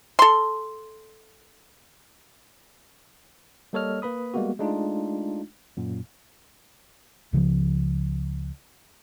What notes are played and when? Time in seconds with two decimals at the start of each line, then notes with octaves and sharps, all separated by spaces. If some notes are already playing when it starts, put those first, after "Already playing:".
0.19 A4 C6
3.73 G3 A#3 A4 C#5 D#5 F6
4.02 A#3 B4 B5 D#6
4.34 G3 G#3 A#3 B3 F#4
4.59 G#3 A3 D4 D#4 F4
5.77 F#2 A#2
7.33 C#2 C#3 E3 F3